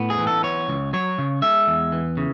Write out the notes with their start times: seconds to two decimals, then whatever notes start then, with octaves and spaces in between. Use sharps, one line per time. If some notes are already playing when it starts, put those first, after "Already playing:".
Already playing: A2 B3
0.10 G#4
0.18 E3
0.27 A4
0.43 B3 C#5
0.68 C#2
0.93 F#3 C#5
1.18 C#3
1.42 G#3 E5
1.67 E2
1.92 E3
2.17 C#3